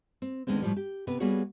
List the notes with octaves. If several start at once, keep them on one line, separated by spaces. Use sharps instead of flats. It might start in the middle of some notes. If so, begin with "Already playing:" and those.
C4
D2 A2 D#3 G#3 B3 C4
A2 F3 G3
G4
C3 B3 B4
G3 A#3 B3 F#4 G#4 C#5